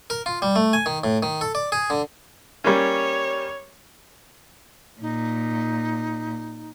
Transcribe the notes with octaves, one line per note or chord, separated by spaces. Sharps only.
A#4
F4
G3
A3
G#5
D#3
A2
D#3
A4
D5
G#4
D3
G3 A#3 C#4 C#5
A#2 D#4